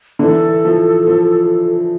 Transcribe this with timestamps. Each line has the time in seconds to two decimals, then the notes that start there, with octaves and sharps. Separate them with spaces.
0.19 D3
0.23 E3 A4
0.65 F3
1.07 F3